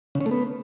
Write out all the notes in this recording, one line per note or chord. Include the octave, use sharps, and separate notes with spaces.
C#3
C#4
A3
B3